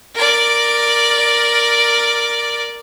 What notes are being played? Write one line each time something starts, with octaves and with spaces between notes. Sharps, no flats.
A#4 D5